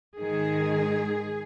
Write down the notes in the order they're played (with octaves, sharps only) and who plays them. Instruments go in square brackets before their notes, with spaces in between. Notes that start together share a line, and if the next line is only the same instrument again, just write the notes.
[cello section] G#2 D#3 G#3 G#4